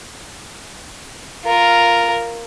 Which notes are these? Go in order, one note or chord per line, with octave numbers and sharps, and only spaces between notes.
F4 A#4